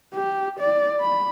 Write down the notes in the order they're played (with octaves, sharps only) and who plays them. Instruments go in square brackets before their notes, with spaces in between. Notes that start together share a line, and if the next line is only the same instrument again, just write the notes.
[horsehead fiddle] G4
D5
B5